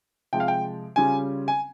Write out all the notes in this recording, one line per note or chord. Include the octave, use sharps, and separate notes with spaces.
C3 F3 G#3 G5
F5
G5
C#3 G3 C#4 F4 G#5
G#5